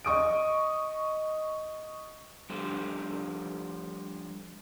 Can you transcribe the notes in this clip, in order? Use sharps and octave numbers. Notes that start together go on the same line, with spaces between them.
D#5 C#6 D#6 D7
F3 G3 D4 G4 A4 C5